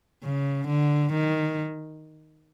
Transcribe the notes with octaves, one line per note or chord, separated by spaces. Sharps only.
C#3
D3
D#3